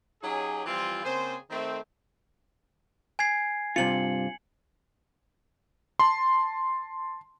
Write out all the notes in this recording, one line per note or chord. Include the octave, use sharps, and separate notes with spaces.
F#3 C#4 D#4 G4 G#4
E3 F3 G3 C4 F4
C#3 A#3 C4 G#4 C5
D#3 A3 C4
G#5 G#6 C7
G2 C3 F4 C#7 F#7
A5 C6